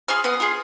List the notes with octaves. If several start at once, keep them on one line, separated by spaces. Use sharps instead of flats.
F4 G#4 F6
B3 D#6
F4 G#4